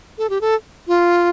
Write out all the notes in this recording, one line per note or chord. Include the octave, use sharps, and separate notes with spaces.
A4
G4
A4
F4